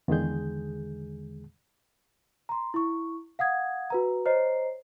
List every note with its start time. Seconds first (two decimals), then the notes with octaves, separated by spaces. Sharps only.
0.08 E2 D3 D#3 G#3 G#4 G6
2.49 A#5 C6
2.74 E4 C#6
3.39 F5 F#5 D#6 G#6
3.90 F#4 B4 A#5
4.26 C5 C#5 D#5 A#5 C7